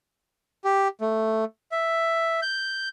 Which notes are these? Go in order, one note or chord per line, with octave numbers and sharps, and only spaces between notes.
G4
A3
E5
G6